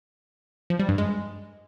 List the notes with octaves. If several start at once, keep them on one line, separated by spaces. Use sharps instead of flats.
F3
G3
G2
G#3